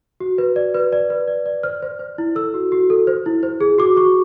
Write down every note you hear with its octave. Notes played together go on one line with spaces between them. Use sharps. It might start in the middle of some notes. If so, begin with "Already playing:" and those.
F#4
B4
D5
B4
D5
B4
D5
D5
C5 F6
C5
C5
E4
A4 E6
F#4
F#4
A4
C5
E4
C5
G#4
F#4 D6
F#4 C#6